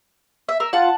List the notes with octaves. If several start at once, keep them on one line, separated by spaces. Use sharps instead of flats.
E5
A#4 E6
F4 F#5 A5